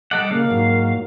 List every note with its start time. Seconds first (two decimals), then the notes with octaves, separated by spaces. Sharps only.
0.11 G3 A4 D#5 F#5 D6
0.31 C#3 A#3 F5
0.51 G#2 F#3